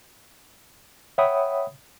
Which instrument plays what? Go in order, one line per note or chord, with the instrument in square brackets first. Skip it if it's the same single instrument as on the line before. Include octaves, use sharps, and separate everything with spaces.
[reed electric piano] C#5 E5 F#5 G5 B5 D#6